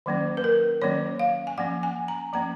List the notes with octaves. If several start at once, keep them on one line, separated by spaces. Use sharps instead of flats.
D#3 F#3 A#3 C#4
B4
A#4
D#3 F#3 A#3 C#4 C#5
F5
G#5
F3 A#3 C#4 F#5
G#5
A#5
F3 A#3 C#4 A#5